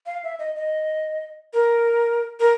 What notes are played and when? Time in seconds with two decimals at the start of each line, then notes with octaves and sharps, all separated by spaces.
0.06 F5
0.24 E5
0.39 D#5
0.56 D#5
1.53 A#4
2.40 A#4